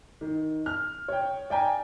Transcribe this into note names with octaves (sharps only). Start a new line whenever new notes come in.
D#3
F6
C#5 G5
D5 G5 G#5 A#5